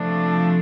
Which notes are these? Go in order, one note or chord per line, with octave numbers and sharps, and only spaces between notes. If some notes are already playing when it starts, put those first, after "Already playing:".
Already playing: C3 F3 A3 D4